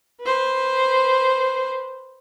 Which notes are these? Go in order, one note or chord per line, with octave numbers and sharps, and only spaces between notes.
B4 C5